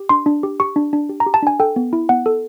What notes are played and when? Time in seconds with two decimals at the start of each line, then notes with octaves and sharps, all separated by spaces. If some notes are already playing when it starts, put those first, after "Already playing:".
Already playing: G4
0.09 D4 C6
0.26 D4
0.43 G4
0.60 G4 C#6
0.76 D4
0.93 D4
1.09 G4
1.20 A#5
1.27 G4
1.34 A5
1.43 D4 G#5
1.60 A4 G5
1.76 B3
1.93 E4
2.09 B3 F#5
2.26 A4